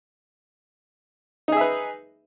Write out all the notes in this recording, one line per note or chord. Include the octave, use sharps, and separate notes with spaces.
D#4 G#4 B4 E5